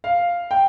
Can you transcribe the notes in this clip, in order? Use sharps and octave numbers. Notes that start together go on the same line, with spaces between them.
F5
G5